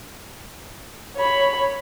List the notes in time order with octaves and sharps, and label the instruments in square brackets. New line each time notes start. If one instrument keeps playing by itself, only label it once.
[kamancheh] C#5 B5